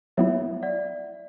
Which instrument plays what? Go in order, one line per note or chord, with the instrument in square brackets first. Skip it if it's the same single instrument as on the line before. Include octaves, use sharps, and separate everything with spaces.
[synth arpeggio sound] F#3 B3 E4 [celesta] C#5 E5
[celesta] D5 F#5